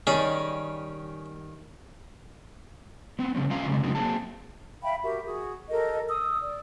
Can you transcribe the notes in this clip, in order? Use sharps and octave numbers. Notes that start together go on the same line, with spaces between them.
D#3 G3 C#4 G#4
B3 C4
C#3 F3 G3 C#4
G3 C#4 F4 D#5 F5 A#5
C#3 G3 G#3 C4
C#3 F#3 G#3 A#3 D#4 F#4
F#3 A#3 C4 G#4 A5
E5 F5 G5 B5
F#4 G4 A#4 E5
F#4 G#4
G4 A4 A#4 D#5
D#6 E6
D5